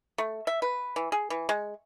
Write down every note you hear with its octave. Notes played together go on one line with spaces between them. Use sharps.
A3
E5
B4
E3
G#4
E3
G#3